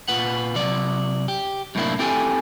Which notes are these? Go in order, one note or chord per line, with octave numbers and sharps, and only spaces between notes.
A#2 F4 B4 F#5
C3 F#3 D5
G4
F#2 A2 C3 A#3 D4 E4
C4 E4 G4 A4 G5 G#5